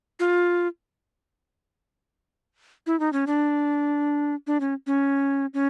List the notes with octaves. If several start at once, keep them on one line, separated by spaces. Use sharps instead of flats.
F4
E4
D#4
C#4
D4
D4
C#4
C#4
C#4